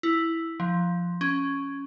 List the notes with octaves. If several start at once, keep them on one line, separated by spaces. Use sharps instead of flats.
E4
F3
C#4